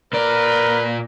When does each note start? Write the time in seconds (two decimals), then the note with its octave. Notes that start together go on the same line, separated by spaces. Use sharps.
0.13 A#2 A#4 B4 D5